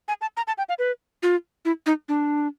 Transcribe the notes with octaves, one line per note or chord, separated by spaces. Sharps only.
G#5
A5
A#5
A5
G5
F5
B4
F4
E4
D#4
D4